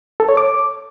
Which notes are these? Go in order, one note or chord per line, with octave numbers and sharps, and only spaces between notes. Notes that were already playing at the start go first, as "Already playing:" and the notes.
A4
C#5
D6